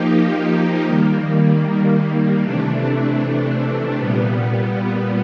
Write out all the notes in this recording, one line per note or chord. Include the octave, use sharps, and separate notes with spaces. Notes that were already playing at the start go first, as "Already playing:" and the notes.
Already playing: F3 A#3 D#4 G4
D#3 G3 A#3
C3 E3 A3 D4
A#2 G3 B3